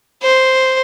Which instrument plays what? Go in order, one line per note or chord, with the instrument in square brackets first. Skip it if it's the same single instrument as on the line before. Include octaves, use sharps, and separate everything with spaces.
[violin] C5